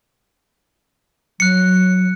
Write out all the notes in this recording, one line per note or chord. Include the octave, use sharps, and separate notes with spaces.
F#3 F#6 C#7